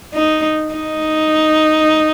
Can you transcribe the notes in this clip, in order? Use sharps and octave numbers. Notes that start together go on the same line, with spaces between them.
D#4
D#4